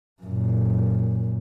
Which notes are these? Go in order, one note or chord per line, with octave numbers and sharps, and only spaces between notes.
F#2 A#2